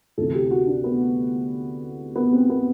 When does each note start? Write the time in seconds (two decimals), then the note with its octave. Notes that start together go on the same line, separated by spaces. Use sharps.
0.18 D2 C3 E3 A4
0.35 G4
0.51 F#4
0.67 D4
0.84 B3
2.16 B3
2.33 C4
2.49 B3